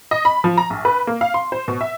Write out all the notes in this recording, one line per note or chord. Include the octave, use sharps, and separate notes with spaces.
D#5
B5
F3
A#5
A#1
B4
A#3
F5
C6
C5
B2
E5